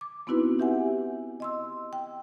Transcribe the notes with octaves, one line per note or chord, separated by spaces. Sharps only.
D6
B3 C4 D#4 E4 F#4 B4
E4 G4 E5 F#5 G#5
D#5 C6 E6
G5